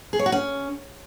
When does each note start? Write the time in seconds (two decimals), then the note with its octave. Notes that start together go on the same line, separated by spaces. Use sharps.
0.13 G#4
0.19 C#5
0.26 F#4
0.32 C#4